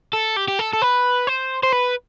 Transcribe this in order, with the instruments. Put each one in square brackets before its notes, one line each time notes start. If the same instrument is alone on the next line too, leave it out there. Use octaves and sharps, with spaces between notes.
[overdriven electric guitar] A4
G4
G4
A4
A4
B4
C5
C5
B4